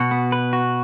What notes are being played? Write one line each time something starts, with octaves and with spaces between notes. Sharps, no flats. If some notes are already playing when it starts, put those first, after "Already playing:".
Already playing: B2 F#4
B3
B4
F#4